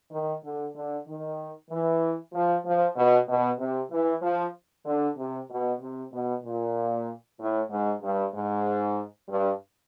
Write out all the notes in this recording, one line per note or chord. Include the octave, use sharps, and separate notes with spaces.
D#3
D3
D3
D#3
E3
F3
F3
B2
B2
C3
E3
F3
D3
C3
B2
C3
B2
A#2
A2
G#2
G2
G#2
G2